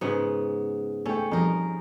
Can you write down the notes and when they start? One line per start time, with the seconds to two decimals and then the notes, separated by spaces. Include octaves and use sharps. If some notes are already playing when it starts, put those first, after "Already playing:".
0.01 G#2 C#3 B3
1.06 A3 C#4 G5
1.31 F2 G3 D#4 A#4